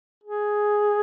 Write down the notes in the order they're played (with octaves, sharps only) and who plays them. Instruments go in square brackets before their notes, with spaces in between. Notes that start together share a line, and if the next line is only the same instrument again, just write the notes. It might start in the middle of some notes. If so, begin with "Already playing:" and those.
[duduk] G#4